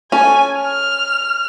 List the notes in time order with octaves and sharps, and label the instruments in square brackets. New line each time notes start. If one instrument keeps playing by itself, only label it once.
[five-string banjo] C#4 A4 [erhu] G#5
[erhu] F6